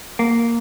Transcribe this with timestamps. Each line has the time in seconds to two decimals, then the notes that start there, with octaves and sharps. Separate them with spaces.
0.19 A#3